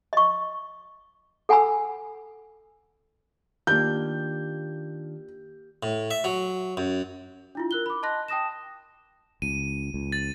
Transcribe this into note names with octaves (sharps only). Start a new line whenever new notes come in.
D#5 C#6
A4 F#5 G#5 A5 B5 E6
D#3 A#3 D4 F4 G4 G6
A2
E5
F#3
F#2
D4 E4 F4
A#4 F#6 G7
B5 D6
D#5 A5 C6 F#6 A#6
G5 A5 D#6 A#6 E7
C#2 D#7
C#2
A6